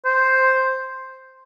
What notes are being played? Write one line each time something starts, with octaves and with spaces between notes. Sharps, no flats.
C5